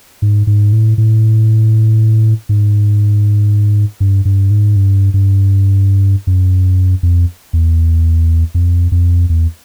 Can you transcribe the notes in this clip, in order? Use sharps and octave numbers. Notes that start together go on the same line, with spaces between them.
G#2
G#2
A2
A2
G#2
G2
G2
G#2
G2
G2
F#2
F2
E2
F2
F2
E2